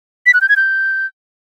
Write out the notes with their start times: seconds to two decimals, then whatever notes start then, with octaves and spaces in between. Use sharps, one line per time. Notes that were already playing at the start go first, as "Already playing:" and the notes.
0.26 B6
0.34 F#6
0.41 G6
0.49 G#6
0.56 G6